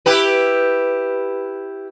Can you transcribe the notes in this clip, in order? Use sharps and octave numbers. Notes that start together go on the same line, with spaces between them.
E4 G4 B4